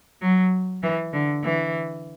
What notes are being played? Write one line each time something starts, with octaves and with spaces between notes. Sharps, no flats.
F#3
E3
D3
E3